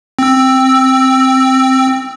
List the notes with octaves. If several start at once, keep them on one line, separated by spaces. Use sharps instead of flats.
C4 E6